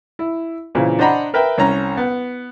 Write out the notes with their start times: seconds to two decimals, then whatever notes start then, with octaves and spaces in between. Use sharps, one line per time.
0.19 E4
0.75 A#2 C#3 E3 C4
0.99 D4 C5 D#5 F#5 A#5 B5
1.34 A#4 B4 E5 G5
1.58 C2 C#4 A#5
1.97 B3